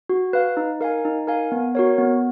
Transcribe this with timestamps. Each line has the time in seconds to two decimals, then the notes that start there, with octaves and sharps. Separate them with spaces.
0.09 F#4
0.33 B4 F5
0.57 D#4
0.81 A#4 F5 G#5
1.05 D#4
1.27 A#4 F5 G#5
1.52 B3
1.75 F#4 A#4 C#5
1.98 B3